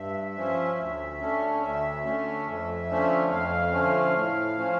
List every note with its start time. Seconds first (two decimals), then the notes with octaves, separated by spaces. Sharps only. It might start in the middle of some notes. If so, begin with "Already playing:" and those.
Already playing: G2 E5
0.36 F3 C#4
0.78 D2
1.20 D3 A3 C#4
1.63 D2 E5
2.04 D3 A3 C#4
2.47 F2
2.89 D3 F3 A3 C#4
3.31 F2 F5
3.72 D3 F3 A3 C#4
4.14 A2
4.57 F3 C#4